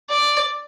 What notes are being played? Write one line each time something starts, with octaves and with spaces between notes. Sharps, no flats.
D5